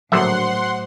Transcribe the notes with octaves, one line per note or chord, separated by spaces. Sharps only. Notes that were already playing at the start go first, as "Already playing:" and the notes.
A#1 A2 D3 F#3 C5 E5 F#5 C6